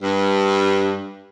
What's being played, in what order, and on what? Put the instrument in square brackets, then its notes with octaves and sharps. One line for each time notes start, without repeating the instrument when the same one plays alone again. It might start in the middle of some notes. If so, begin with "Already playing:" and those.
[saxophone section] G2